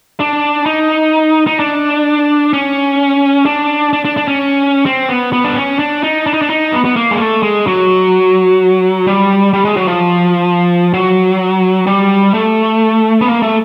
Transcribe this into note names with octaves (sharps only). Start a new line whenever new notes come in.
D4
D#4
D#4
D4
C#4
D4
D4
D4
D4
C#4
C4
B3
B3
D4
C#4
D4
D#4
D4
D#4
D4
D#4
B3
B3
A#3
G#3
A3
G#3
F#3
G3
G3
G#3
F#3
F3
F#3
G3
A3
B3
A#3
A3